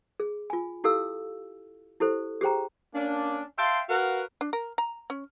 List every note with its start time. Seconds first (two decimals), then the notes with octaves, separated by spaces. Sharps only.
0.20 G#4
0.50 F4 G#5
0.84 E4 G4 A4 F5 E6
2.00 E4 G4 A4 C5
2.41 G4 G#4 C5 G5 A#5
2.95 A#3 C#4 D4
3.59 E5 F5 G5 A5 C6
3.89 F#4 A#4 B4 F5 F#5
4.41 D4
4.53 A#4
4.78 A#5
5.10 C#4